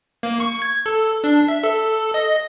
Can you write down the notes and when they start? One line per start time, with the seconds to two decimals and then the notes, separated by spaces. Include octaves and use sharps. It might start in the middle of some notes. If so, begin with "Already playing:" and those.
0.23 A#3
0.40 C#6
0.62 G#6
0.86 A4
1.24 D4
1.48 E5
1.64 A4
2.14 D#5